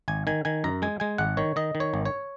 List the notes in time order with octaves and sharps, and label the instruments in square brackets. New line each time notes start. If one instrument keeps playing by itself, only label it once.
[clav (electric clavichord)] G#1 G#5
D#3 G#5
D#3 G#5
F#2 A#5
G#3 G#5
G#3 G#5
G#1 F#5
D#3 C#5
D#3 D#5
D#3
C#5
G#1
C#5